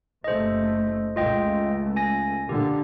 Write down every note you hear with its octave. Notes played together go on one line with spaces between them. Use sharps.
F#1 C3 A3 C5 D#5
C#2 A3 F4 D#5 G5
G#5 A#6
A#2 D3 G4